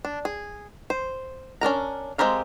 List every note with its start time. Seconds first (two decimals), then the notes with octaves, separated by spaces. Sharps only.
0.05 D4
0.25 G#4
0.90 C5
1.61 C#4 D4 A#4 A#5
2.18 G#3 C4 G4 A#4 F5